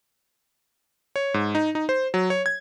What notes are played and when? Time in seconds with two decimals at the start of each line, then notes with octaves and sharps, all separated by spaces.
1.16 C#5
1.34 G#2
1.55 D#4
1.75 D#4
1.89 C5
2.14 F#3
2.30 C#5
2.46 G#6